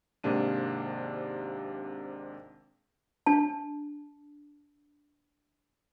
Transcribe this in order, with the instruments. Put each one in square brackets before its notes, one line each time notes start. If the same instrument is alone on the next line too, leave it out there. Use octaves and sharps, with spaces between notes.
[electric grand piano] G#1 G#2 C3 A#3 D4 D#7
[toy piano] D4 A5